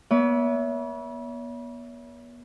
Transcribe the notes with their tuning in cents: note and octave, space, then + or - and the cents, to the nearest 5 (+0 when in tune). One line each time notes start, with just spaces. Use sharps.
B3 -35 C#5 +40 E5 -5